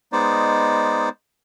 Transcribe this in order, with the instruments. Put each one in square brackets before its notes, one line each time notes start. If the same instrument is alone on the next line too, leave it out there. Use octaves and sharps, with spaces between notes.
[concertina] G#3 B3 D#4 C5 D5